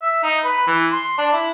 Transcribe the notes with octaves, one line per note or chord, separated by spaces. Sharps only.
E5
D#4
B4
E3
C6
D4
E4